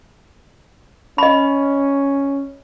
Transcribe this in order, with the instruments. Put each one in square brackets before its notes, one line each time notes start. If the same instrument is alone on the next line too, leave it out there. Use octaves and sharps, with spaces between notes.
[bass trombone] C#4 [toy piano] D#5 B5